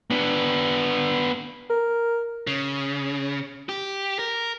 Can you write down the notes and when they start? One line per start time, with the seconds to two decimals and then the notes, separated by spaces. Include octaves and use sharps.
0.10 B3 D4
1.70 A#4
2.47 C#3
3.69 G4
4.19 A#4